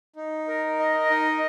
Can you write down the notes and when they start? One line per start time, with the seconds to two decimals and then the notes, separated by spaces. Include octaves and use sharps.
0.16 D#4
0.48 A#4
0.79 D#5
1.10 D#4